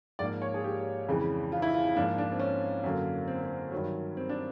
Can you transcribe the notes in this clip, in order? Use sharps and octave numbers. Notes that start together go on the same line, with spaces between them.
G#2 F3 A#3 D5
C#5
G#4
G4
F2 C#3 E3 G#3
F4
E4
F4
F4
G#2 F3 A#3 D4
D4
C4
C#4
F#2 D3 F#3 A#3
C4
C4
G2 D#3 F#3
C4
D4